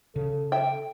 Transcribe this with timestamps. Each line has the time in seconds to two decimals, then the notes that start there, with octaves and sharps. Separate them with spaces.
0.16 C#3 A4
0.52 E5 G5